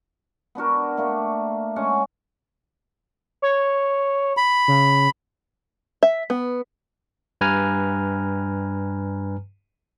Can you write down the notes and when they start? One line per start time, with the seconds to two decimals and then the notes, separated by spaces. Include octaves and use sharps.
0.55 B3 D4 F#4 A#4
0.97 A3 A#3 D5
1.76 G#3 C#4 F#5 G#5
3.42 C#5
4.37 B5
4.68 C#3
6.03 E5
6.30 B3
7.41 G2 B4 G#5 A#5 F6